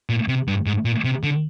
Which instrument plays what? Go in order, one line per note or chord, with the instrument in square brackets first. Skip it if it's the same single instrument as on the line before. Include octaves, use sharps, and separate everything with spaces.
[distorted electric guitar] A#2
C3
G2
G#2
A#2
C3
D3